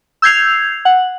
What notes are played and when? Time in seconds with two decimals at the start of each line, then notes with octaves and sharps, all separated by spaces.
0.22 E6 G6 G#6 C7 F7
0.85 F#5